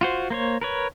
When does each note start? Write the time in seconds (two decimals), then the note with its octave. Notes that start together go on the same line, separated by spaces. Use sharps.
0.01 F4 F#4 C5
0.30 A#3 C5 C#5
0.61 A#4 B4 C#5